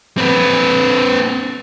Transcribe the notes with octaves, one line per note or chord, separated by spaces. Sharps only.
C4 B4